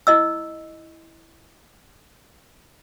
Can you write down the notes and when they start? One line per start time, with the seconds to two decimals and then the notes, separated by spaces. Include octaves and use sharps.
0.07 E4 D#5 E6